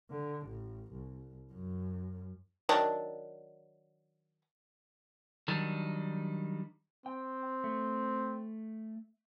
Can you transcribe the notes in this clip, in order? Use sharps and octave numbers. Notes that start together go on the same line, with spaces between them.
D3
A1
C2
F#2
D#3 F#3 D4
D#3 F#3 G3 D4 D#4
C4 G5
A3